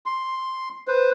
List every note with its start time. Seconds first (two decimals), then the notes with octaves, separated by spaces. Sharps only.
0.06 C6
0.88 B4 C5